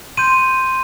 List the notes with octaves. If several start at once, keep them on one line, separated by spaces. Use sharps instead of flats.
C6 G6 D#7